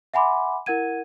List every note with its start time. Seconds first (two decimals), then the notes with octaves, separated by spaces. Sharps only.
0.14 E5 F#5 G#5 B5 C6 D6
0.66 E4 A#4 F#5 G#6 D#7